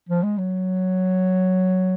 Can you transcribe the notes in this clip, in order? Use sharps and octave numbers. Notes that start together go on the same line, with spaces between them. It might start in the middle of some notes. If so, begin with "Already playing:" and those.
F3
G#3
F#3